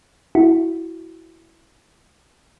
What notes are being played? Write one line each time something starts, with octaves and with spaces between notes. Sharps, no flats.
E4 F#4